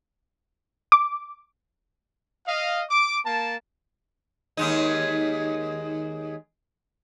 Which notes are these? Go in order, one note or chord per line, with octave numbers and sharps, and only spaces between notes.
D6
D#5 F5
D6
A#3 A5
D#2 G#3 D#4